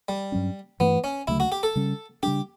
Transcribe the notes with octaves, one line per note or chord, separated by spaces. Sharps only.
G3
G2 F#3 C#4
G2 E3 A3 B3
C#4
D2 C#3 F#3 A3 E4
F#4
G4
A4
C#3 G3 C#4
C#3 G3 D4 G4